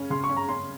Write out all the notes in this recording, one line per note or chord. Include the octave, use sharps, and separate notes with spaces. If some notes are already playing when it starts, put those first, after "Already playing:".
Already playing: C#3 C#4
C#3 C6
C#6
C#4
A#5
C#4 C6